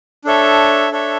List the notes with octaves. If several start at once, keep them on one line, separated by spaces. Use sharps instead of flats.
D4 A4 C#5 E5
D4 A4 C#5 E5